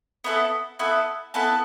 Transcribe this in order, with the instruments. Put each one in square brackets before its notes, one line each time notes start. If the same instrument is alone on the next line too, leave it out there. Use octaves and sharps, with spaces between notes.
[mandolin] B3 E4 A4
B3 E4 A4
B3 E4 A4 A5